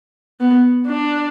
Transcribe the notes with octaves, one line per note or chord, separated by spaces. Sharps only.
B3
D4